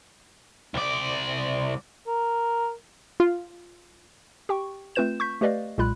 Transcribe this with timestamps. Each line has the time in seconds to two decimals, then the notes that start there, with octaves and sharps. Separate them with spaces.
0.74 C2 D5
2.07 A#4
3.20 F4
4.49 G4 G5 C#6
4.95 A3 C4 F4 B4 G6 E7
5.20 C#6 G6 B6
5.41 A3 G4 B4 D5 D#5 F5
5.78 B1 A#2 G#3 F4 B5 F#6